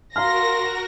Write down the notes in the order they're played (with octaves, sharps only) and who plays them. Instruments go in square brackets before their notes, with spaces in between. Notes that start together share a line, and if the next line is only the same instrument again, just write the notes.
[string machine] F#4 A#4 [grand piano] F5 A#5 F6 [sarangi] C6 [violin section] A#6